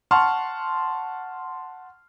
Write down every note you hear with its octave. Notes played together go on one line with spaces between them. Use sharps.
F#5 A5 C6 C#6 F6